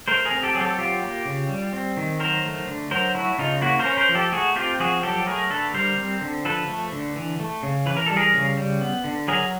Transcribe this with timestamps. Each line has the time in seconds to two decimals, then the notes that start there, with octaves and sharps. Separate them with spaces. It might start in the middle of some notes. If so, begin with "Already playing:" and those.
0.08 A3 A#4 C5
0.25 G#4 A#4
0.31 C4
0.43 G4 A4
0.55 F#3 G#4
0.61 G4 A4
0.78 F#3 F4 G4
1.02 A#3
1.26 C#3
1.49 G3
1.73 C4
1.97 D#3
2.20 F#3 A#4 C5
2.44 A3
2.67 D3
2.91 F#3 A#4 C5
3.15 A3 E4 F#4
3.38 C#3 D#4 F4
3.61 A#3 E4 F#4
3.79 A#4 C5
3.85 C#4
3.97 A#4 C5
4.09 F3
4.15 G4 A4
4.32 A3 F#4 G#4
4.56 C4 F4 G4
4.80 F3 F#4 G#4
5.03 F#3 G4 A4
5.27 A3 G#4 A#4
5.50 D3 A4 B4
5.74 G3 A#4 C5
5.98 C4
6.21 D3
6.45 F3 A4 B4
6.68 A3
6.92 D3
7.16 E3
7.40 A3
7.63 C#3
7.86 E3 B4
7.97 A#4
8.06 G3 A4
8.17 G#4 A#4
8.34 C#3
8.57 G3
8.81 B3
9.04 D3
9.28 F#3 G#4 A#4